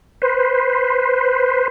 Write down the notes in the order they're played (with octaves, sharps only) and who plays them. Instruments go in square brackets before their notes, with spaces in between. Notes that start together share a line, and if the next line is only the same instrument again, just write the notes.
[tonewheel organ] B4 C5